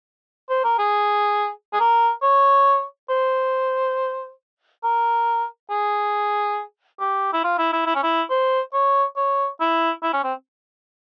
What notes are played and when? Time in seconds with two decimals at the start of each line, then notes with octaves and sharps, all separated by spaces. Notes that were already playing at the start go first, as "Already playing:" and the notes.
0.50 C5
0.64 A#4
0.79 G#4
1.73 G#4
1.80 A#4
2.22 C#5
3.09 C5
4.84 A#4
5.70 G#4
7.00 G4
7.33 E4
7.44 F4
7.58 E4
7.73 E4
7.86 E4
7.95 C#4
8.03 E4
8.30 C5
8.73 C#5
9.16 C#5
9.60 E4
10.03 E4
10.13 C#4
10.24 C4